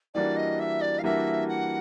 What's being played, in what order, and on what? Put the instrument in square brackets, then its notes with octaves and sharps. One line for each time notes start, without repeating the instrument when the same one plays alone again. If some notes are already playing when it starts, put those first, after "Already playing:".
[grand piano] E3 G3 A#3 D4 F#4 [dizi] D5
[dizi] D#5
E5
D5
F5
[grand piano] E3 G3 A#3 D4 F#4 [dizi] E5
[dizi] F#5